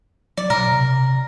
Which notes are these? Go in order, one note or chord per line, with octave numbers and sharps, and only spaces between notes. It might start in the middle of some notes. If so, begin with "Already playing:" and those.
F#3 D5
B2 A#4
C3